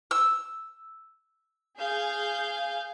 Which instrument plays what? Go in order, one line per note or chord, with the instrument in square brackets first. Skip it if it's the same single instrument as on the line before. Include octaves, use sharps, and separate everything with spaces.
[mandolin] E6
[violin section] G#4 F5 G6